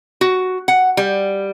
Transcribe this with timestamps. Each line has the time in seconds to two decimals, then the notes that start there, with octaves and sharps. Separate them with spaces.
0.21 F#4
0.68 F#5
0.97 G3